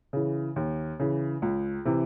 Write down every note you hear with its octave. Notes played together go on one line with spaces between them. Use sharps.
C#3 E3
D#2
C#3 E3
C#2
C3 E3